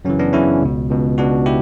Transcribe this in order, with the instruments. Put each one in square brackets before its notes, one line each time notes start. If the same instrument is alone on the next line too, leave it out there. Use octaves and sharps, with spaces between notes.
[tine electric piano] F#2 C#3 E3 C#4
B3 D4
F#2 C#3 E3 C#4 E4
C#2 B2
C#2 B2
C#2 B2 D4 F#4
E4 G4